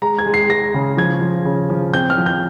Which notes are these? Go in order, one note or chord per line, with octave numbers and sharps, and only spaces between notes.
G#3 A#5
G#6
G#3
C7
G#3 A#6
C#3
F3 G#6
F3
C#3
F3
C4 G6
F6
F3
G6